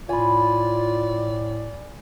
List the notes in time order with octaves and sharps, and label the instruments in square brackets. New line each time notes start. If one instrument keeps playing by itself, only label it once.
[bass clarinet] A2 [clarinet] F4 [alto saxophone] D5 [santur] G#5 B5